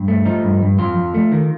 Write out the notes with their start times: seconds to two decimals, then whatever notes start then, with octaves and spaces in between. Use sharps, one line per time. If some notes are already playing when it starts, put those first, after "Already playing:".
Already playing: G2
0.08 A3
0.25 F3 D#4
0.44 G2
0.62 G2
0.79 F2 F4
0.97 F2
1.14 A3
1.32 D#3